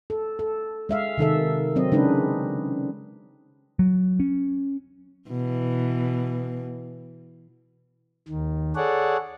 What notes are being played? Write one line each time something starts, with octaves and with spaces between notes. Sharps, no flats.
A4
A4
G#3 E5 F5
C3 D#3 A4 E5
F#3 C4 D#5
C#3 G#3 D4 D#4 B4
F#3
C#4
B2 E3
D#2 D#3
G#4 A4 C#5 D5 F#5